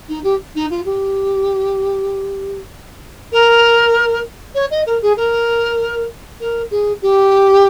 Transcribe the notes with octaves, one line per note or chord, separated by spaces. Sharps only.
D#4
G4
D#4
F4
G4
A#4
C#5
D#5
A#4
G#4
A#4
A#4
G#4
G4